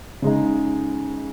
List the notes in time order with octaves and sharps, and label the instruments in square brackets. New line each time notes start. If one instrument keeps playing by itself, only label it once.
[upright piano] C#3 G#3 D#4